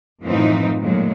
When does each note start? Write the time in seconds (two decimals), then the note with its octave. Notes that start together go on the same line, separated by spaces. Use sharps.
0.22 F#2 A2 E3 F3 C4 D#4
0.81 F#2 A#2 D#3 F#3 G#3 A3